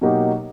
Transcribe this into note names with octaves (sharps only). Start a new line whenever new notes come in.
B2 F#3 A#3 D#4 G4